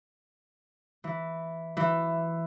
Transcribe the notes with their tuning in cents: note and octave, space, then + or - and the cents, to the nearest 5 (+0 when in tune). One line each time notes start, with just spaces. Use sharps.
E3 +0
E3 +10